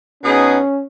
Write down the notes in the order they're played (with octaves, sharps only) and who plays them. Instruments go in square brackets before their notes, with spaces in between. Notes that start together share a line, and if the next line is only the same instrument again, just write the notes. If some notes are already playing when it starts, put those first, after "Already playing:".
[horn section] B2 B3 D#4 G#4 [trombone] C#4